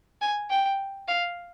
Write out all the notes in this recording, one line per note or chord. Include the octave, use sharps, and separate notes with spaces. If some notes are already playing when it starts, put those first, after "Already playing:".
G#5
G5
F5